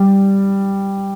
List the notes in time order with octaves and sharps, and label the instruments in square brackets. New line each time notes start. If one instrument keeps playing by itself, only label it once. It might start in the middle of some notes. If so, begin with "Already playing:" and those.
Already playing: [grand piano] G3